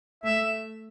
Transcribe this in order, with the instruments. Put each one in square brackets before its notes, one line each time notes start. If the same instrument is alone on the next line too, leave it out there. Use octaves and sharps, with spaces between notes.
[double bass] A3 [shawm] E5